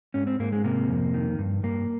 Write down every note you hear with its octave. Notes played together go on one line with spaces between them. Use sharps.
G#2 C#4
C4
G#2 A#3
G#3
C3 A#3
F2
D#3
G2
G2 A#3